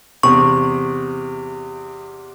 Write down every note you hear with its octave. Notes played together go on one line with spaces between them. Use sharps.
E2 C3 C#6